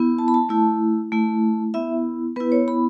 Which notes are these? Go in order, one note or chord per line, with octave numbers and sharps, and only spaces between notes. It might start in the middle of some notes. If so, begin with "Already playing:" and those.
Already playing: B3 E4
A5
B5
A5
A3 E4
A3 E4
B3 E4 E5
B3 E4 B4
C#5
B5